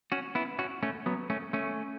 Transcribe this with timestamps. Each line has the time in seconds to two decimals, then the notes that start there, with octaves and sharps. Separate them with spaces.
0.12 C#4 F#4
0.35 B3 E4
0.59 C#4 F#4
0.83 A3 C#4
1.06 F#3 B3
1.30 A3 C#4
1.53 A3 C#4